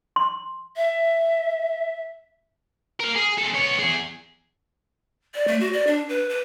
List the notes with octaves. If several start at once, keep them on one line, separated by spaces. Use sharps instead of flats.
C6
E5
A#4 F5
G#4
G#3 A4
B3 C#5
E2 G#4
D5
A3
F#4
D5
D4
B4
B4